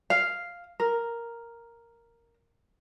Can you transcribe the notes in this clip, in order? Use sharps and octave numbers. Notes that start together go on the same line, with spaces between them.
F5
A#4